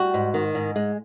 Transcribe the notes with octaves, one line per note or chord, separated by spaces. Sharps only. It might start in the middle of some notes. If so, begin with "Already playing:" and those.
Already playing: G3 F#4
G#2
D#3
G#2
G#3